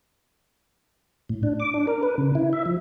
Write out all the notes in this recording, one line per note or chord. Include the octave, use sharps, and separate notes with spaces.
A2
D4
D6
D4
A#4
B4
C#3
E4
E5
F3